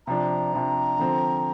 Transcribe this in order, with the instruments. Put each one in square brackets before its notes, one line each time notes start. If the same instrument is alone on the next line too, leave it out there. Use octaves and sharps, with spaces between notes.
[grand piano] C3 F3 D4 [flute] A#5
[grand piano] C3 F3 D4
D3 F3 C4